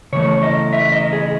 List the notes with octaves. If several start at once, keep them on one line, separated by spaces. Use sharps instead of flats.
C#3 E3 A3 C#5
D#5
E5
D#5
G#4